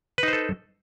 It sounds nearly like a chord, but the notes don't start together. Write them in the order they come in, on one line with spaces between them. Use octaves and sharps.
B4 D#4 C5 A4